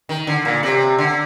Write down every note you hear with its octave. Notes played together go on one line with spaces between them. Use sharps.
D#3
D3
A#2
C3
D3